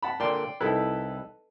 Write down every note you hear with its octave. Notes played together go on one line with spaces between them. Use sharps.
F#5 A5 B5
A#2 D3 D5 G5 C6
C2 D#4 E4 A4 B4